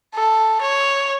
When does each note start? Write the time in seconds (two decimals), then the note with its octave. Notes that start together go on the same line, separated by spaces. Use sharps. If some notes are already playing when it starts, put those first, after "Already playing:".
0.15 A4
0.62 C#5